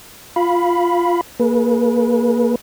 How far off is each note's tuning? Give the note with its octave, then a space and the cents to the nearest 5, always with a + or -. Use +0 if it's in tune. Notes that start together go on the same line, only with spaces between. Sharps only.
F4 +0 F5 +0 B5 +0
A#3 +0 G#4 +35 B4 -30